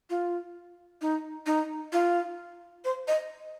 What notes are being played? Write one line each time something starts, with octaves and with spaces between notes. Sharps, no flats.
F4
D#4
D#4
F4
C5
D#5